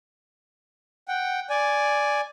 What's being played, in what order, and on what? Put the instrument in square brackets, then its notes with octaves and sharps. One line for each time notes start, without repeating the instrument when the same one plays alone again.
[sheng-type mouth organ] F#5 G5
D5 G#5